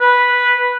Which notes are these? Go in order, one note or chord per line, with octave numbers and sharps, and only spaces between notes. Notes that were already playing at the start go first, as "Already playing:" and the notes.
B4